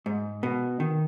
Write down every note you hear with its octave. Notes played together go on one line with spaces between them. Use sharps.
G#2
B2
D#3